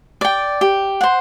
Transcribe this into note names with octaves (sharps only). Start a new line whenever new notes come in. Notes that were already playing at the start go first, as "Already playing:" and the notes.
D5 G5
G4
C5 F#5